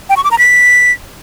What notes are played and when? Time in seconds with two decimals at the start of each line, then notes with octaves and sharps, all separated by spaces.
0.09 G5
0.17 C#6
0.24 D6
0.31 A#5
0.38 B6